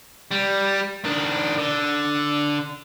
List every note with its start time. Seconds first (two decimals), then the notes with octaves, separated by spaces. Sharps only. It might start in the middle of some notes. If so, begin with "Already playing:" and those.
0.31 G3
1.05 D#3 D4
1.58 D3